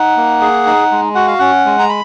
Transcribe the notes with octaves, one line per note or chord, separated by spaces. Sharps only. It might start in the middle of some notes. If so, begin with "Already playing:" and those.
Already playing: D#4 F#5
A#3
G#4
D#4
G#3
F#4 F#5
F5
C#4 F#5
G#3
A#5
B5